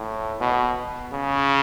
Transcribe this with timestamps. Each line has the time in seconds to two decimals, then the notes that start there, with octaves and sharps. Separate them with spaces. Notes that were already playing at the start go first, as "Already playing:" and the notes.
Already playing: A2
0.41 B2
1.13 C#3